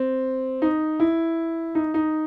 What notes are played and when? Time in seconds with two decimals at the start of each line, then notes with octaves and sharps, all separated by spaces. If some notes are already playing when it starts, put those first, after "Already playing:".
Already playing: C4
0.62 D#4
1.00 E4
1.75 D#4
1.94 D#4